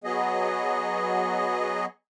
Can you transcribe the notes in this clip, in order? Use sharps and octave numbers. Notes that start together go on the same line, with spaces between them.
F#3 B3 G#4 D#5